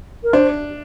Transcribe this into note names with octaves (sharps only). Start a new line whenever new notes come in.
A#4
D4 C5